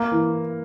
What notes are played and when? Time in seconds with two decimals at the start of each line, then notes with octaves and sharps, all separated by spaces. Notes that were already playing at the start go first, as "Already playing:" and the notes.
Already playing: A#3
0.12 E3